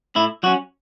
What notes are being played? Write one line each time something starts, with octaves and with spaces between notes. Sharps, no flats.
A2 E4
F#3 C#4 F#4